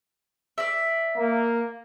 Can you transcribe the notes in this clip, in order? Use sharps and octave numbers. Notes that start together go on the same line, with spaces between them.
D5 E5
A#3